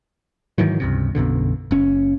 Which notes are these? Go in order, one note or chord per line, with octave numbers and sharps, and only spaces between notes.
G#2 D#3 E3 F#3
C#2 G2 C3
B1 F#2 B2 D3
F#1 C#4